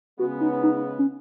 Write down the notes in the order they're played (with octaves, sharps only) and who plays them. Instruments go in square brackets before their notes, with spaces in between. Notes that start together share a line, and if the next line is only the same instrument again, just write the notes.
[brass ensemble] C#3 G#3 B3 [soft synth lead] F#4
[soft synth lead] D#4
D#4
C#4